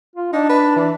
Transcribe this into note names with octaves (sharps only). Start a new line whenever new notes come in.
F4
D4 D#4
B4
E3